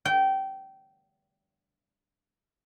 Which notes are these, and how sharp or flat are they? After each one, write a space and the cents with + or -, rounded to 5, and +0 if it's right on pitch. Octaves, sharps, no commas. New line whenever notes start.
G5 -20